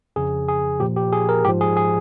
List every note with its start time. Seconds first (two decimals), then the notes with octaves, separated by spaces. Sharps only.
0.16 F2 C#3 F3 G#4
0.48 G#4
0.80 A#2 F3 G4
0.96 G4
1.12 G#4
1.29 A#4
1.45 G#2 G4
1.49 F3
1.61 G#4
1.77 G#4